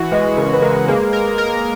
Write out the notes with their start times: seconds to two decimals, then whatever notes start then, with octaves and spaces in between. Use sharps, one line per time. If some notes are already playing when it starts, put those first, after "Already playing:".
Already playing: E3 F#4
0.11 G#3 B4 D#5
0.37 C#3 A#4
0.53 B4
0.62 G#3 A#4
0.88 A#3 G#4 B4
1.13 A#4
1.38 A#4